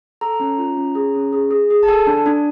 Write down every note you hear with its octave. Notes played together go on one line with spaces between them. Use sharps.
A4 A#5
C#4
F4
C#4
G#4
C#4
G#4
G#4
G#4
A5
A4 G#5
D4
D4